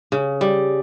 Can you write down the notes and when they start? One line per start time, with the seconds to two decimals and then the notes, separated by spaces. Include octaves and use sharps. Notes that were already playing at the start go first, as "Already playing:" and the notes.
0.12 C#3
0.41 G3